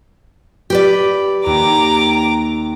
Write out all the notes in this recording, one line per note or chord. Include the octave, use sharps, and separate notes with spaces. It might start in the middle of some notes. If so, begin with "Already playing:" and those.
G4 B4 D5
D#2 A#5 D6